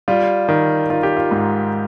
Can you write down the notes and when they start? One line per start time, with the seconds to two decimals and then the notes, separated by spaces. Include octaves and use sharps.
0.08 G3 F4
0.48 D#3
0.90 D#3 F4
1.03 G4
1.16 F4
1.31 G#2